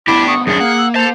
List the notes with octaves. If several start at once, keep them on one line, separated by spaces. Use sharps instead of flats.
D2 B3 D4 E4 G4 D6
C#6 D#6
F#2 D#3 C#4 D4 G#4 C#7
A#3 F5 F#5
E6
A4 C5 A5 F7